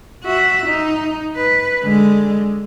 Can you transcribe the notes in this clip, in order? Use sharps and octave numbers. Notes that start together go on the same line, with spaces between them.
F#4 E5
D#4
B4
D3 G#3